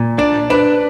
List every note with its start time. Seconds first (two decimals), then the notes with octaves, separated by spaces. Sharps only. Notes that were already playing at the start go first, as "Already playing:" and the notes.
Already playing: A#2
0.18 D4 D5
0.50 D4 B4